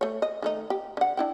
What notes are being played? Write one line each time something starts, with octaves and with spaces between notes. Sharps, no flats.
A3 C#5
D#5
D#3 A3 D#4
G4
D3 F#5
D4 E4 G5